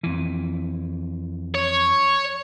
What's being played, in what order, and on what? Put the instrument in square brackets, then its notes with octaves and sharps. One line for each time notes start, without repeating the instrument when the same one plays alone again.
[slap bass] F2 E3
[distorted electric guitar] C#5